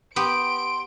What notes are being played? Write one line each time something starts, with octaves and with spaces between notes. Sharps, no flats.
B3 G4 C6 D7